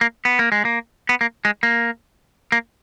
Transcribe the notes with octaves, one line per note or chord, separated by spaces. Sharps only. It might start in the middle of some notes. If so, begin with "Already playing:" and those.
A#3
B3
A#3
G#3
A#3
B3
A#3
G#3
A#3
A#3